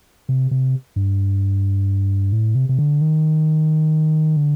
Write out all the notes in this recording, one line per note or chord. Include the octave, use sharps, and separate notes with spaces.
C3
C3
G2
A2
C3
C3
D3
D#3
D3